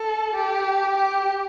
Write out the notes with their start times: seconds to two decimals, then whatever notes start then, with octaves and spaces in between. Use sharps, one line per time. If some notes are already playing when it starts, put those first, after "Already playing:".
Already playing: A4
0.35 G4
0.97 G4